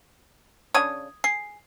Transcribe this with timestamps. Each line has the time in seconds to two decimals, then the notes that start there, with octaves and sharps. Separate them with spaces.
0.74 C#3 D4 C#5 D#6 G#6 D#7
1.24 G#4 C7